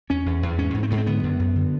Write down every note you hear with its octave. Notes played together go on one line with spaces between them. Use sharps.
E2 C#4
E2
E2
G#2 C#4
G#2
C4
G#2 B3
C4
D3 B3
F#2
F#2
D3